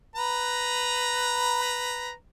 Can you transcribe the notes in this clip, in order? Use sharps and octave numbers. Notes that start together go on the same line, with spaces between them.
B4 A#5